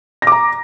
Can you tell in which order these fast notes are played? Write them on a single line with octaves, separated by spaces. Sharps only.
A#6 D6 A#5